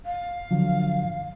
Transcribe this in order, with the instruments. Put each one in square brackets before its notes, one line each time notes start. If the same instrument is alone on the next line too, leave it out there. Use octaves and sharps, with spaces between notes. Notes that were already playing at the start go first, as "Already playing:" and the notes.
[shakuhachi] F5
[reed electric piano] D3 F3 F#3